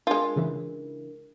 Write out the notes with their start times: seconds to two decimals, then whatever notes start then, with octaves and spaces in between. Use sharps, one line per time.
0.07 G#3 D4 F4 A#4
0.36 C#3 E3